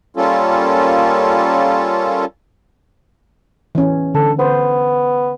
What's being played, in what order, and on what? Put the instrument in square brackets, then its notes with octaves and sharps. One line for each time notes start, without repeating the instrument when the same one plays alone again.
[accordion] G3 A#3 C#4 F4 A4
[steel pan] E3 C#4
[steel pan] D3 [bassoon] A4
[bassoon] B3 [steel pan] C5